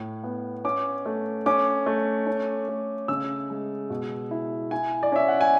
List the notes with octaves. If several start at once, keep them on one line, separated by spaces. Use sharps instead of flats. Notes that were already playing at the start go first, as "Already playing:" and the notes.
Already playing: A2
B3
C#4 D6
A3
C#4 D6
A3
C#4
A3
C#3 E6
G#3
B2
E4
E4 G#5
D5
C#4 E5
F#5
G#5